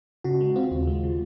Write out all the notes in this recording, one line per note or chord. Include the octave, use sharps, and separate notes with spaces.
C#3 F#4
G#3
C4 F4
D#2
G#3
C#3